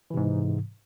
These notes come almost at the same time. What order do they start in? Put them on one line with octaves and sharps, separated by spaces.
E3 C3 G#2